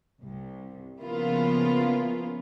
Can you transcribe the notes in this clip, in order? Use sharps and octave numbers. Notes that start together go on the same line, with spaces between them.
C2
C#3 F3 A#3 B3 E4 F4